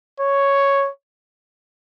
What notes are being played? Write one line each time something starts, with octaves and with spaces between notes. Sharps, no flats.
C#5